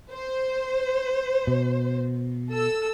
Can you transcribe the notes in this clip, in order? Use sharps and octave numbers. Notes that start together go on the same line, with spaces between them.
C5
B2
A4 E6